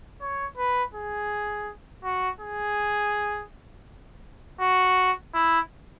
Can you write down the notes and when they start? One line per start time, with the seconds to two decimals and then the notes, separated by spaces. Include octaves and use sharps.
0.21 C#5
0.58 B4
0.94 G#4
2.04 F#4
2.41 G#4
4.60 F#4
5.34 E4